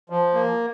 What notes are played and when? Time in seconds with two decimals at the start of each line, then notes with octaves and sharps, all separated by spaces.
0.10 F3
0.34 A#3